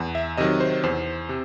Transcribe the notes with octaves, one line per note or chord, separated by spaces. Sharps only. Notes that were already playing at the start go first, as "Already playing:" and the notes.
Already playing: E2
E5
C3 D#3 F#3 D#5
C5
E2 C5
C3